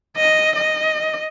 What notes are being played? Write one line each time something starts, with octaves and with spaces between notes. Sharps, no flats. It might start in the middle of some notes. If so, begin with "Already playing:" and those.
D#5
D#5